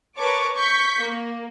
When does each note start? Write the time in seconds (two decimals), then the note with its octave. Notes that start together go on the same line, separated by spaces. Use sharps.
0.19 A#4 B4 C#5 A5 C#6 D6
0.57 C#6 G6 B6
1.00 A#3